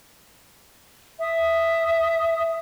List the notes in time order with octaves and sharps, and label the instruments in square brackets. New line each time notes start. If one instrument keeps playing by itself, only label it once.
[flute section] E5 D#6